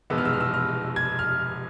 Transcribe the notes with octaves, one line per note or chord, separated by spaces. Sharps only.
F1 E2 B2 G#3 B3 E6
F6
E6
F6
E6
F6
G#6
F6